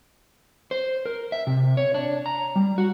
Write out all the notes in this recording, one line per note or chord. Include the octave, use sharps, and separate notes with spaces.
C5
A#4
E5
C3
C#5
D4
A#5
G3
F#4